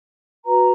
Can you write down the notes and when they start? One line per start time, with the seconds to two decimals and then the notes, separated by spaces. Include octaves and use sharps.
0.45 F#4 B4 A#5